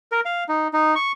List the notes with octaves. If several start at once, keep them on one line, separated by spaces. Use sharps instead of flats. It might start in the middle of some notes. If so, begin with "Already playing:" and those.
A#4
F5
D#4
D#4
C#6